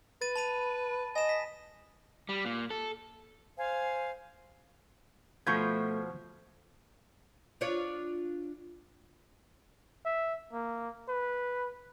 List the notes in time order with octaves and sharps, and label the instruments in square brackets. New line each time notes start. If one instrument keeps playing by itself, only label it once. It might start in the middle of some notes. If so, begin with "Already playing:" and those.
[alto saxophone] B4 [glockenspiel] A6 D#7
[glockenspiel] A5 B5 D#7
[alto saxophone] D#5 [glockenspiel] G#5 E7
[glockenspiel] B6
[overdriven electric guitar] G3
A#2
A4
[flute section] C5 F5 G#5
[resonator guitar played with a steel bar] B2 F3 [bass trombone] A3 [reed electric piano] C#6 G6 G#6
[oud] D4 F4 C#5
[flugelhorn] E5
A#3
B4